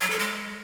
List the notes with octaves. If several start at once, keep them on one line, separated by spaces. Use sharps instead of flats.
F#3
A4
G#3